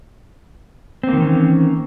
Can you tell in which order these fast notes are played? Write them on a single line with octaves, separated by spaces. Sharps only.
C4 A#3 D#3 E3 C#4